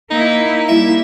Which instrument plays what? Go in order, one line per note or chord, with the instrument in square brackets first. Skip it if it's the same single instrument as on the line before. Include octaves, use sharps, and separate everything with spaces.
[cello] A#3 E4 [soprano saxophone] D#4
[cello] G3 A#3 [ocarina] E4 [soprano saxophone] E5